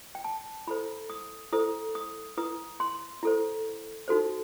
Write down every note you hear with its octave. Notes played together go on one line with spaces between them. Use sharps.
G5
A5
E4 A4 C5 B5
D#6
E4 A4 C5 D#6
D#6
E4 B4 D#6
C6
E4 A4 C5
D#4 F#4 A4 C5